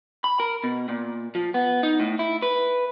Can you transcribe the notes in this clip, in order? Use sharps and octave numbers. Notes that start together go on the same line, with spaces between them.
B5
A#4
B2
A#2
F3
B3
D#4
A2
E4
B4